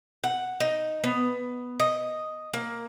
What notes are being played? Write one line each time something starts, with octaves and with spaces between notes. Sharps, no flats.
F#5
D#4
B3
D#5
A#3